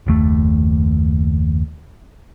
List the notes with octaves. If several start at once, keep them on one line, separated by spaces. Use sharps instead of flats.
F#1 D#2 A3